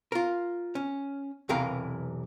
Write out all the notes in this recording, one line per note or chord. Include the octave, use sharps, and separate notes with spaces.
F4 A#4
C#4
B1 E2 C3 E3 A#4 F5